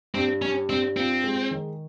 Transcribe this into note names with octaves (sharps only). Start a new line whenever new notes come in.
G2 C4
G3 C#4
G2 C4
C4 F4
G#3
D#3